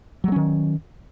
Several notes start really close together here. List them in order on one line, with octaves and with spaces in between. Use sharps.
F#3 G#3 C#4 D#3